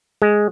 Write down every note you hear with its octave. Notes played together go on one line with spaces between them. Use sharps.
G#3